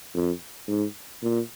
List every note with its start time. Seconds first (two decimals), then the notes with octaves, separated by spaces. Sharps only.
0.14 F2
0.68 G#2
1.23 A#2